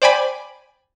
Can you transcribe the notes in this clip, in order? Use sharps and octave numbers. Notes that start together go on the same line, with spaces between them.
C5 D5 G5 G#5 B5 D6